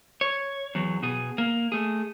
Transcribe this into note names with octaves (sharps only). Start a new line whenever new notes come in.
C#5
E2 F#3
B2 G#4
A#3
A3 G#4